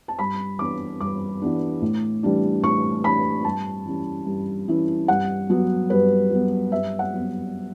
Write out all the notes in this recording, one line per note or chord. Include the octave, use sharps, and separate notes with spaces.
A5
G2 B5
E3 G3 B3 D4 D6
G2 D6
E3 G3 B3 D4
A2
E3 G3 D4
A2 C#6
E3 G3 D4 B5
G2 A5
E3 G3 C#4 E4
G2
E3 G3 C#4 E4
G2 F#5
F#3 B3
G2 B4
F#3 B3
G2 E5
F#5
F#3 B3